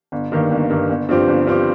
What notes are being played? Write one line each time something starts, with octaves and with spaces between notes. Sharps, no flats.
G1
G2 D#3 A#3
G1
G2 D#3 A#3
G1
G2 F3 C4 G4
G1
G2 F3 C4 G4